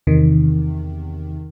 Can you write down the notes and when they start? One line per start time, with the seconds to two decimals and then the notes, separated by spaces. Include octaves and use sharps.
0.07 E2 C3 D#3